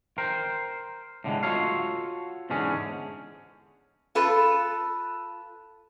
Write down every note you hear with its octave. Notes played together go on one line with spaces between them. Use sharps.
A#4 C5 G5
A2 D3 E3 G#3
F4 F#4 G#4 A4 C#5 F5
E2 G#2 D3 C#4 G#4
F4 A4 B4